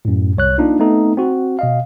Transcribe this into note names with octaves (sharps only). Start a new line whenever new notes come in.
F#2 A2
C2 C#5 F#6
A#3 D4 D#4 F4
A3 B3 C4 D#4 A4
C4 F#4
B2 D#5 F5